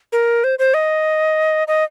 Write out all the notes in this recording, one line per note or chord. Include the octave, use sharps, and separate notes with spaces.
A#4
C5
C5
D#5
D#5